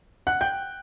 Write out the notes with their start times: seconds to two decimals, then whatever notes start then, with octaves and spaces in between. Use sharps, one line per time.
0.27 F#5 F#6
0.41 G5 G6